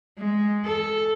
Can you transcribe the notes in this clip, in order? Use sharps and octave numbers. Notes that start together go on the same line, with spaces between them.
G#3
A4